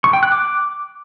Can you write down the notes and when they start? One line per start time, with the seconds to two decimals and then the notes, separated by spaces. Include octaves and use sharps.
0.04 C#6
0.13 G5
0.23 F#6
0.32 D6